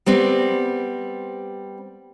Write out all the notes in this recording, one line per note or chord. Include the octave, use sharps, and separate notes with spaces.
G3 B3 C4